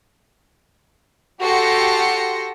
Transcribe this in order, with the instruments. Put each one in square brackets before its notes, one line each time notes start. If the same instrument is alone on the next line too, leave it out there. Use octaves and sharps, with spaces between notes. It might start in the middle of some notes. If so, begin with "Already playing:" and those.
[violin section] F#4 G4 A4 C6 A#6 C#7